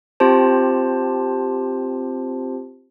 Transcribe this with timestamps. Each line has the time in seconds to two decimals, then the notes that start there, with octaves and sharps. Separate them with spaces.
0.20 C4 F4 G4 C5 A5